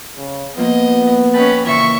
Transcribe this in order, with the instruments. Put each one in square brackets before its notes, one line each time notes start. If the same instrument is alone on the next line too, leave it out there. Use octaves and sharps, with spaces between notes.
[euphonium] C#3
[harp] F3 A#3 A#5 [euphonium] B3 [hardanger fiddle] D#5
[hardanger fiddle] C#4 B4 [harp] D#5 G5 A5
[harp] A#2 C#3 E3 [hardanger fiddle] E5 C#6